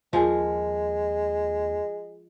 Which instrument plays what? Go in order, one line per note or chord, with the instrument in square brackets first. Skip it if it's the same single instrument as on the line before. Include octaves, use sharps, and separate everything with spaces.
[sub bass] D#2 [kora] F3 G#4 A#4 [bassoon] G#3